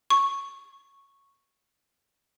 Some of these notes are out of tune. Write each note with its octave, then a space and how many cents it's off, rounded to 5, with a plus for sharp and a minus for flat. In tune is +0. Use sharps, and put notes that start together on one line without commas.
C#6 -5